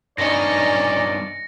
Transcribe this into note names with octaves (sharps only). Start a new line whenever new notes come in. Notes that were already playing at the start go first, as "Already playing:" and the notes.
G2 D#3 C#4 D#4 D5 A#6 C#7